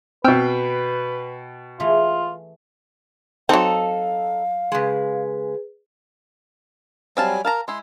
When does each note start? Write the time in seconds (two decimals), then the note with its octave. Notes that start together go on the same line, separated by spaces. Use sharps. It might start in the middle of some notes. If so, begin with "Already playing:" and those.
0.24 B2 C4 B4 G5 E6 F6
1.80 E3 A3 F4 G#4
3.49 F#3 C4 D#4 A4 F5
4.72 C#3 G#3 G#4 B4
7.17 F#3 G3 C4 F5 G#5 A5
7.45 A#4 F5 A5 A#5
7.68 G#3 E4 C6